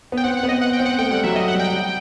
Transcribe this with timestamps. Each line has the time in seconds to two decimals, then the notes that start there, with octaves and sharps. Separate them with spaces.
0.12 B3
0.17 G5
0.24 C4 F#5
0.37 F#5
0.43 B3
0.49 D#5
0.61 F#5
0.73 G5
0.80 C4
0.86 F#5
0.98 A3 G5
1.11 G3 F#5
1.24 F#3 E5
1.35 F#3 D#5
1.48 F#5
1.54 G3
1.59 G5
1.73 G3